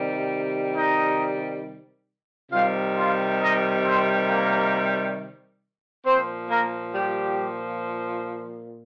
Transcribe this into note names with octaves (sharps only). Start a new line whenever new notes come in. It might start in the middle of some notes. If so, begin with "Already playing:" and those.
Already playing: C3 D#3 G3
D#4 D#5
C3 D#3 G3 F4 F5
F4 F5
D#4 D#5
C4 C5
A#3 A#4
A#2 F3 C4 C5
A#3 A#4
G3 G4